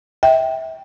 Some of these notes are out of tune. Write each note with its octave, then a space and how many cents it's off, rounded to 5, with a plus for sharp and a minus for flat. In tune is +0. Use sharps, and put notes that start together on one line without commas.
E5 -25 G5 +0